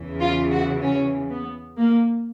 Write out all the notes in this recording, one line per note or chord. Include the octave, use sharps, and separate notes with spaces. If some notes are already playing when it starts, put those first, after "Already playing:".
Already playing: E2 C#3 E3
F4
F#4
C#4
B3
A#3